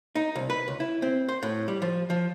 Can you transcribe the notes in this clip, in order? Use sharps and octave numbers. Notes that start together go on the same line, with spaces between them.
D#4
C2
B4
C#2
E4
C4
C5
A2
G3
F3
F3